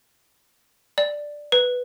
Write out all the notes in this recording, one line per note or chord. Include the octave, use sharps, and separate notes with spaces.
D5
B4